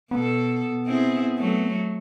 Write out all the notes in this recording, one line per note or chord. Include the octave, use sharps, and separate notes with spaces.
B2 B3 A4
C4 E4 G#4
F#3 A3